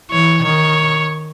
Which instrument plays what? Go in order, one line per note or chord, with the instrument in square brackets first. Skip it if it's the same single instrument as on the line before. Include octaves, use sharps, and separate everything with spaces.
[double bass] E3 [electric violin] C#5
[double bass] D#3 [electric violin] C#5